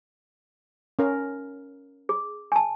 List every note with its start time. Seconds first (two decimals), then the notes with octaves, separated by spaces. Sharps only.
0.99 C#4 A#4
2.09 G#4
2.52 G#5 A5